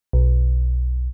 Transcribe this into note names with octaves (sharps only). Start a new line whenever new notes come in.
B1